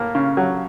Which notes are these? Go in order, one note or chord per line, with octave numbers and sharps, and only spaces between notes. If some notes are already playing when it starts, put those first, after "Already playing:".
Already playing: A2 A#3
C#3
F#3